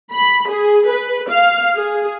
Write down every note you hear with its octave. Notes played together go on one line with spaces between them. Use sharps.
B5
G#4
B4
F5
G#4